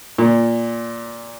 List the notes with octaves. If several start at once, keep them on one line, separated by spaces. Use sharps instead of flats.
A#2